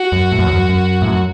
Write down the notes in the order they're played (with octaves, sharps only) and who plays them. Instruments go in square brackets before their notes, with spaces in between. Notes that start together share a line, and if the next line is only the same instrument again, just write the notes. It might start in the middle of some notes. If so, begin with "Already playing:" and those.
Already playing: [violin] F#4
[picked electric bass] F#2
A2
F#2
E2
F#2
F#2
A2
F#2